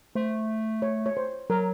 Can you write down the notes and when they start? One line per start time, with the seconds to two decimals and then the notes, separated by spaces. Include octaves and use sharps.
0.15 A3 C5
0.82 C#5
1.06 C#5
1.17 C5
1.50 F#3 A#4